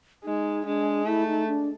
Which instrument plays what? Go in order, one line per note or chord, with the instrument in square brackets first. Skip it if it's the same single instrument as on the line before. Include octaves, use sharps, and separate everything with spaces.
[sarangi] G#3 [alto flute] D#4
[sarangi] G#3 [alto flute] D4
[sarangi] A3 [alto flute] E4
[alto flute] D#4
D4